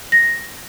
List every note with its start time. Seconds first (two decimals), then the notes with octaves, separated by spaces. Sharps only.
0.12 A#6